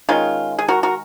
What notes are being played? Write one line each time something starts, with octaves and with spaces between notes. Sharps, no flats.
D#3 G#3 C#4 F4
G#4
F#4 A#4
F#4 A#4